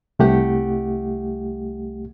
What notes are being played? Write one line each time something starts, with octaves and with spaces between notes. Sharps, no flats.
C2 A3 G4 F#5